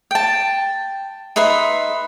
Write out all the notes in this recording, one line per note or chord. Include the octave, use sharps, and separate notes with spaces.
G5 A5
D#4 B4 E5 C6